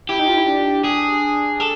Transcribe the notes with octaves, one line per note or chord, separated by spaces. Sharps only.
E4 G4
D#4
F4
E4
D4
G#4
A4